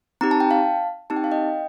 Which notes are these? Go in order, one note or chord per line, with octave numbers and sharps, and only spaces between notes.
C4 D#4 G4 A#5
A5
G5
F5 A5
C4 D#4 G4 A5
G5
F5
D#5 G5